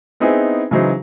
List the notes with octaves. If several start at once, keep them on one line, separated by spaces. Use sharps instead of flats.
B3 C4 D#4 E4 G#4
C#3 E3 F#3 D#4 C5